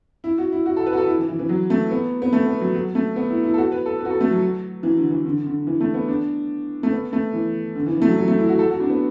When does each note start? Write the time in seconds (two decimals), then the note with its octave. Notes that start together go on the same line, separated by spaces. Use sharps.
0.24 E4
0.38 F#4
0.52 E4
0.66 F#4
0.77 A4
0.86 B4
0.93 F#4
0.97 A4
1.07 E4
1.18 E3
1.28 E3
1.39 E3
1.49 F#3
1.70 A3
1.91 B3
2.22 B3
2.33 A3
2.46 B3
2.61 F#3
2.74 F#3
2.95 A3
3.16 B3
3.30 E4
3.44 E4
3.54 A4
3.58 F#4
3.72 B4
3.86 A4
4.00 B4
4.05 F#4
4.10 A4
4.20 A3
4.31 F#3
4.83 E3
4.97 D3
5.10 E3
5.26 D3
5.46 D3
5.67 E3
5.81 A3
5.94 B3
6.08 D4
6.83 A3
6.92 B3
7.13 A3
7.33 E3
7.75 D3
7.86 E3
7.96 E3
8.02 A3
8.07 F#3
8.17 F#3
8.28 A3
8.38 E4
8.49 F#4
8.59 A4
8.70 F#4
8.80 D4
8.90 B3